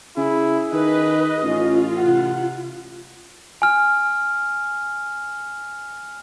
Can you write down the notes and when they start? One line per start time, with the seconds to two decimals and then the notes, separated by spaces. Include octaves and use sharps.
0.17 C#3 E4 G#4
0.73 D#3 B4 D#5
1.43 A1 C#4 F4
1.98 C3 F#5
3.62 G#5 F6